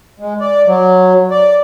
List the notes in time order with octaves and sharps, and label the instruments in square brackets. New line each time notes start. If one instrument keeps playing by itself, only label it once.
[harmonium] G#3
D5
F#3
D5